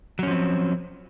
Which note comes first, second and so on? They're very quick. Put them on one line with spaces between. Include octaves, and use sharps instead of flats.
F#3 C#4 F3 C4